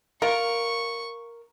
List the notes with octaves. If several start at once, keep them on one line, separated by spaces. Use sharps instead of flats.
F4 A#4 C#6